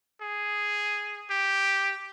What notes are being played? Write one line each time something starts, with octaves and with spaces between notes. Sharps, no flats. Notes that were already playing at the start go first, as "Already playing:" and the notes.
G#4
G4